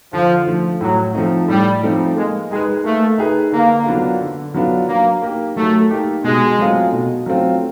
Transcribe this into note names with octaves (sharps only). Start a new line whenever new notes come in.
D3 F3
F3 A3
A2 F#3
F3 A3 C4 D#4
A2 G3
F3 A3 C4 D#4
G#3 A#3
G#3 D#4 G#4 B4
A3 A#3
D#4 G#4 B4
D3 A#3
F#3 B3 D4 F4
D3
F#3 B3 D4 F4
F#3 A#3
A#3 D#4 G4
F#3 A3
A#3 D#4 G4
B2 G#3
F#3 A3 C4 F4
B2
F#3 A3 C4 F4